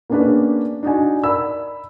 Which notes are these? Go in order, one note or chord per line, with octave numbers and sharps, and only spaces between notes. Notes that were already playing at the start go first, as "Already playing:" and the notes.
A#3 B3 C#4 D4 G#4 B4
D4 D#4 F#4 G#5
A#4 D5 B5 E6